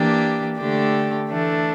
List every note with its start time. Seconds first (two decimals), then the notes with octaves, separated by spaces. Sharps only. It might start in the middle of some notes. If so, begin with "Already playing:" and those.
Already playing: E3 A#3 D4 G4
0.59 D3 A3 D4 G4
1.29 E3 A3 D4